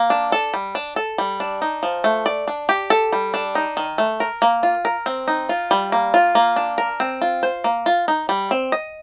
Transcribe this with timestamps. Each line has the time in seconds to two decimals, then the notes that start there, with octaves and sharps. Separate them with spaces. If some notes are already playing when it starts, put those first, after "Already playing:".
Already playing: A#3
0.10 D4
0.32 A4
0.54 G3
0.75 D4
0.96 A4
1.18 G3
1.40 D4
1.62 D#4
1.83 F3
2.04 A3
2.26 D5
2.48 D4
2.69 G4
2.90 A4
3.13 G3
3.34 D4
3.55 D#4
3.77 D#3
3.98 A3
4.20 A#4
4.42 A#3
4.63 F4
4.85 A#4
5.06 C4
5.28 D#4
5.49 F4
5.71 G3
5.92 A#3
6.14 F4
6.35 A#3
6.56 D4
6.78 A#4
7.00 C4
7.22 F4
7.43 C5
7.64 A#3
7.86 F4
8.08 D#4
8.29 G3
8.51 C4
8.72 D#5